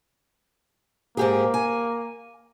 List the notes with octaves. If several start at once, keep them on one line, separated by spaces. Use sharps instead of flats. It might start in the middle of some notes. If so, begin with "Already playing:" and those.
G#2 A#3 G4 G#4
G#5